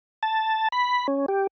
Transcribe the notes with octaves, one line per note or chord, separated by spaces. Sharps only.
A5
B5
C#4
G4